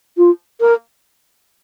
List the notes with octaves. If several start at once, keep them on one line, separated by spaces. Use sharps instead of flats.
F4
A#4